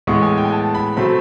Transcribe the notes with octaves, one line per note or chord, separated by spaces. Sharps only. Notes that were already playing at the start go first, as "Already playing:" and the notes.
A2 E3 G#3 B3 C#6
G#5
G5
G#5
A5
B5
B2 F#3 A3 C4 B5